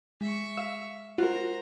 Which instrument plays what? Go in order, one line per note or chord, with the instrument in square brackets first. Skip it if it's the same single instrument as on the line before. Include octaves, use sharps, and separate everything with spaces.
[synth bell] G#3 [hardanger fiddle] E5 C#6
[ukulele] F5 [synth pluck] E6
[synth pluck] F4 [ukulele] F#4 A#4 [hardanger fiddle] C5 A#5